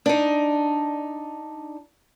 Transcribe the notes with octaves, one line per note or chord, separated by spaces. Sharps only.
D4 D#4